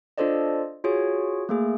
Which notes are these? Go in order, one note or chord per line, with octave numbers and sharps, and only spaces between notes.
D4 F4 A4 C5 D5 D#5
F4 F#4 G#4 C#5
A3 A#3 G#4